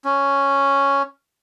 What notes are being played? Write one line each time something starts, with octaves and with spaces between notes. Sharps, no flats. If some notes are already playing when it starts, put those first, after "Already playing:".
C#4